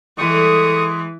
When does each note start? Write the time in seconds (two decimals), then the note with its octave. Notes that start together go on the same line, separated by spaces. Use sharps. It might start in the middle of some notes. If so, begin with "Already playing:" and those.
0.18 E3 G3 G#3 A4 D#5 C#6 D#6